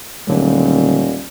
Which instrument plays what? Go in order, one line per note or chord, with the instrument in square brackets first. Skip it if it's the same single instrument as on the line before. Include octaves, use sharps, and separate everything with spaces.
[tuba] D#1 [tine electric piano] D3 F#3 A3